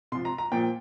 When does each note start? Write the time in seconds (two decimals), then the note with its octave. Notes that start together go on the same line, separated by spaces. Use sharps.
0.12 C3 F3 C6
0.25 A#5
0.38 A#5
0.52 A#2 F3 G5